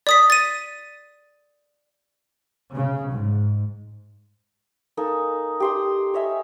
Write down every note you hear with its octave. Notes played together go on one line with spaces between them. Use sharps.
D5 D#6 B6
A6 D#7
C#3
G#2
A#3 D#4 A4 G#5
G4 C6 D#6
C#5 D#5 E5 G#5